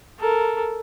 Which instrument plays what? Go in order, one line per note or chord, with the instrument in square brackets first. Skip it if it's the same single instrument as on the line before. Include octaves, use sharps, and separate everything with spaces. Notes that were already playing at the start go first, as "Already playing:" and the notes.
[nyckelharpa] A4 A#4